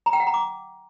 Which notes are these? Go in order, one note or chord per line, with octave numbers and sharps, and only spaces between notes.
A#5
G5
F#5
A#5
D6